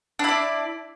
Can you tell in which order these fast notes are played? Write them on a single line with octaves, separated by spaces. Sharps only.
D4 E4 D5